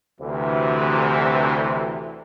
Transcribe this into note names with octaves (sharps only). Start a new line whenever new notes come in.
D2 C3 E3